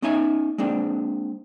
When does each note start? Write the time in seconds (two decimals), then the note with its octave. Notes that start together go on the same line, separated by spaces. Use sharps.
0.02 B3 C#4 D#4 D#5 E5 G#5
0.58 G#3 A#3 C4 D4